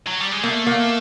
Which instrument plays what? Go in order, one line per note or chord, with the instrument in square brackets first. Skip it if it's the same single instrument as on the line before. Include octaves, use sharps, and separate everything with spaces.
[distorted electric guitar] F#3
G3
G#3
[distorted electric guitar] A3 [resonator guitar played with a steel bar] A#3
[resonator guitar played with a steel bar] A#3